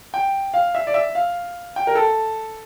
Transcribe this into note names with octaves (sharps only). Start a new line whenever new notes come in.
G5
F5
E5
D5
E5
F5
G5
A#4
A4